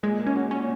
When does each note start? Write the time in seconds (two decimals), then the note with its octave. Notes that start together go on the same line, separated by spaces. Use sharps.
0.03 A#2 G#3
0.20 A#3
0.27 C#4
0.36 F#4
0.51 A#2 C#4